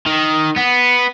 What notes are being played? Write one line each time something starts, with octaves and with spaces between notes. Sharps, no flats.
D#3
B3